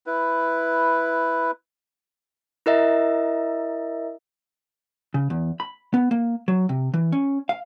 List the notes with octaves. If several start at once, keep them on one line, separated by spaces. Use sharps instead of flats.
E4 B4
E4 A#4 D#5 E5
C#3
E2
B5
B3
A#3
F#3
C3
E3
C#4
F5